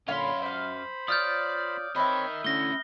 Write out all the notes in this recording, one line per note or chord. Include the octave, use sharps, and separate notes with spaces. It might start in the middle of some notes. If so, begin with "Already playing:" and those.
F#2 A#2 D3 C#5 F5 B5 C6
C5 D5 F5 B5
F4 C#5 D5 D#6 F6 G6
C4 A#4 B4 C#5 D#5 E5
D3 A3 C#4 E4 A#6 G7